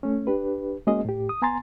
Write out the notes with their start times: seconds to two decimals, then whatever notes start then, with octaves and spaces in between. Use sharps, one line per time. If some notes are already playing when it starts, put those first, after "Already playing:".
0.03 A3 C#4
0.27 D4 G4 B4
0.87 G#3 A#3 C#4 F#4 G#4 D#5
1.05 A2 G4
1.29 D#6
1.42 B3 G#5 A#5 C6 A6